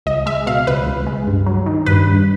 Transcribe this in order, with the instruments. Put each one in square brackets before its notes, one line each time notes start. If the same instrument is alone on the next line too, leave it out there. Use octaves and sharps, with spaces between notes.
[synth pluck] C#2 D#5
G#3 E5
B2 F5
C#2 B4
C#2
G#3
G2
F#3
D#3
G2 B4
G2